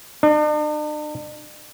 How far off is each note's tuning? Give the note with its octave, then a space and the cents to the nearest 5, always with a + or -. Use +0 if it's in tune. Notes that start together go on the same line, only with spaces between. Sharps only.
D4 +45